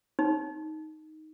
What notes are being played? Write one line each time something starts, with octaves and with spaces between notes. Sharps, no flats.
D#4